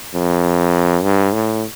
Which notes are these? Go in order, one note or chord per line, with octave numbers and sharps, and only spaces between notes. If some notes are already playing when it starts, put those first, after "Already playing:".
F2
G2
A2